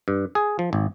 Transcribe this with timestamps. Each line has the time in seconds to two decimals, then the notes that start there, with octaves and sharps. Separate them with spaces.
0.08 G2
0.35 G#4
0.59 F3
0.73 G#1